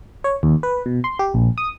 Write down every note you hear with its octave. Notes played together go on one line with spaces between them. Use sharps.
C#5
D#2
B4
B2
C6
G4
A#1
D#6